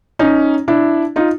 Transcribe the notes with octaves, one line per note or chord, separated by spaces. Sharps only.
C#4 D#4
D4 E4
D#4 F4